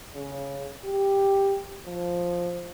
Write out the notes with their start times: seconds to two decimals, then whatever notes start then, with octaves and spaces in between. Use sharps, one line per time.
0.14 C#3
0.85 G4
1.87 F3